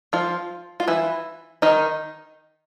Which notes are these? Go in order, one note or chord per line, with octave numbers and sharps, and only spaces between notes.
F3 F4
F4
E3 E4
D#3 D#4